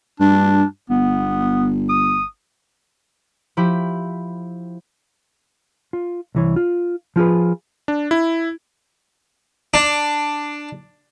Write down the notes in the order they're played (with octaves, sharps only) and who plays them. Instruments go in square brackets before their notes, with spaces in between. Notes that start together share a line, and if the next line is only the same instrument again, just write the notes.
[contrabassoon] G2 [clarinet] D4
[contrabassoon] G1 [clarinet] B3
[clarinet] D#6
[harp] F3 E4 G4 B5
[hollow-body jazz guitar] F4
C2 E3 C#5
F4
F3 F4 G#4 B4
[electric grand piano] D4
E4
[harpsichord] D4